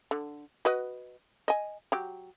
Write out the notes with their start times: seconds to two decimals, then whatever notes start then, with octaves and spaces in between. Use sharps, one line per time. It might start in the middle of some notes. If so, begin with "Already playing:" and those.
0.11 D3
0.65 F#4 B4 D#5
1.48 D#5 G#5
1.92 F#3 G4